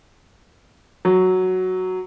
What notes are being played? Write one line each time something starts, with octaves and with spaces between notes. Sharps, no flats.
F#3